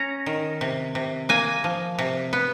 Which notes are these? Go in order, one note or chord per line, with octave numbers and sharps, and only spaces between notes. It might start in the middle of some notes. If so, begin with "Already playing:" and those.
Already playing: C#4 A#5
D#3
C3
C3
A#3 G#5
F3
C3
B3